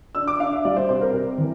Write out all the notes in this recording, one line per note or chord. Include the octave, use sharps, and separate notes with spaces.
D4 E6
D6
D4 F5
E5
G3 D5
C5
C3 C5
A#4
C3 A#4
E3